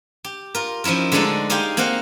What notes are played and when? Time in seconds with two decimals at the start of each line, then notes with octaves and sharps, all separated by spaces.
0.24 G4
0.55 F4 A#4
0.84 F3 C#4 D#4 E4 A#4
1.12 D3 G#3 A3 D4 D#4 A4
1.50 D#4 G4 G#4 F5 G5 C6
1.77 A#3 C4 D#4 F5 F#5